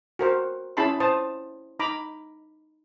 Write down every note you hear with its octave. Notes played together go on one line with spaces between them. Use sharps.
F#4 A#4 C5
C#4 E4 G#4 A5 B5 C6
C5 A5 D#6
D#4 A#5 B5 D6